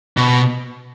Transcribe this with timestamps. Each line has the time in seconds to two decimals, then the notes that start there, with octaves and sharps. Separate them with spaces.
0.17 B2